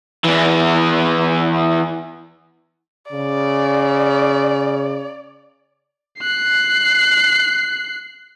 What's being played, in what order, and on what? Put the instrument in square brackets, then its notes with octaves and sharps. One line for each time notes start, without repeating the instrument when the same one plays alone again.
[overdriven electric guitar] E2 E3
[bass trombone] C#3 [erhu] D5
[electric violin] F#6 C7